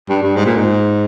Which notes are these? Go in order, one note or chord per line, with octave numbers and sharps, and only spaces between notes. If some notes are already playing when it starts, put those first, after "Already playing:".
G2
G2
G#2
A#2
G#2